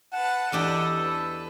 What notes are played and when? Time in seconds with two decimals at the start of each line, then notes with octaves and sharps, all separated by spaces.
0.13 B4 F#5 A5
0.52 E2 D4 G4 A4 D5 D#5
0.98 B4